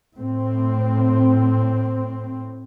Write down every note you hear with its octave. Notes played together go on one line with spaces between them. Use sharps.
A2 C4